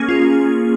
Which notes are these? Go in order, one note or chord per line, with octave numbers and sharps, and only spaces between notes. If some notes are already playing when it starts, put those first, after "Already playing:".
Already playing: A#3 C#4 G#4
F4